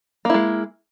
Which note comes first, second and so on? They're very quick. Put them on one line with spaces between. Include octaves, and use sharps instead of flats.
A#3 E4 G#3